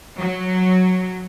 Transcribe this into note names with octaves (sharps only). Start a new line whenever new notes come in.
F#3